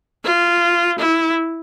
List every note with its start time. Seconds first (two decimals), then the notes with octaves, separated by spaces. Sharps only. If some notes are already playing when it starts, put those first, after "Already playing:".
0.24 F4
0.99 E4